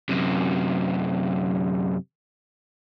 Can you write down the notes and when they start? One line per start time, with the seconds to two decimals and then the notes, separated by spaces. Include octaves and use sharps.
0.09 F#2 C3